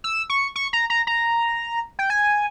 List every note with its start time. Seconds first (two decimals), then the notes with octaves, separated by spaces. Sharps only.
0.04 E6
0.30 C#6
0.56 C#6
0.73 A#5
0.90 A#5
1.07 A#5
1.99 G5
2.10 G#5